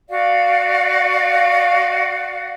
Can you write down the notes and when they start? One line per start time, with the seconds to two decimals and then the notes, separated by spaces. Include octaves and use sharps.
0.09 F#4 D5 F5